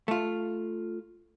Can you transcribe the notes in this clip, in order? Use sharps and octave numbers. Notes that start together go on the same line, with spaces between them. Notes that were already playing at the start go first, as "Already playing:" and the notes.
A3 F4